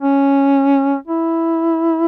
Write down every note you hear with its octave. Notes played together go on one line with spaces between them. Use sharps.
C#4
E4